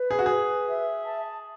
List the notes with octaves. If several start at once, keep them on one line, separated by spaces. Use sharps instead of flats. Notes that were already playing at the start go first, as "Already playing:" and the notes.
Already playing: B4
G#4
F#4
G#4 B4
E5
A5